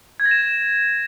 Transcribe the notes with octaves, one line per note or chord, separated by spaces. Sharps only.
G#6
A#6
E7